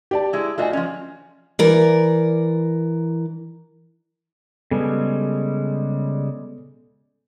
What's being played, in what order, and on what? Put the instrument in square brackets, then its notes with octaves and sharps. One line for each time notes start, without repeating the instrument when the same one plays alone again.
[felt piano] G4 D5 A5
[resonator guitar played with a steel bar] G#3 E4
[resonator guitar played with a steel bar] A3 F4 F#4 [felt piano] D5 D#5 G#5
[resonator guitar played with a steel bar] F3 C#4
[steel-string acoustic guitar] E3 A#4 D5
[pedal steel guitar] C#3 G3 G#3 [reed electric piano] B3 A4 G#5